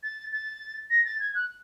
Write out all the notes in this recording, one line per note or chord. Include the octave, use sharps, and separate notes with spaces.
A6
A6
A#6
A6
G#6
F#6